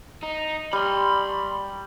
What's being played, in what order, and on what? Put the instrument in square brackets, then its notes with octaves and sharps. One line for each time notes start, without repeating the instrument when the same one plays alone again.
[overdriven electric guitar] D#4
[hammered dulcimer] G3 [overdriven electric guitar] B5 C6